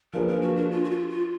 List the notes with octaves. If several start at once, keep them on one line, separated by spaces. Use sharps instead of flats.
F3 A#3 D4 G#4 A#4 B4
A#4
F#4
D4
F4
F#4
F4
F4